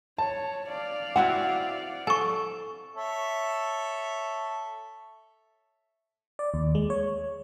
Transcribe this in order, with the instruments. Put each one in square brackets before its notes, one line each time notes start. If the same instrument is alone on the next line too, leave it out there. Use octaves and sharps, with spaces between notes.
[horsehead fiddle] C#5 [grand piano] A5
[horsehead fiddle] D5 F5
[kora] C4 E4 F#4 [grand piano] F#5
[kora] A4 [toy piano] G#5 C#6
[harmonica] A4 C#5 E5
[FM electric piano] D5
D#2
G#3
C#5